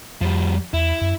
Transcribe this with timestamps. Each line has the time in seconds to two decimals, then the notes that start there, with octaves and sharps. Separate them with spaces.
0.21 F2 F3 G3
0.73 E2 E4
1.01 F#2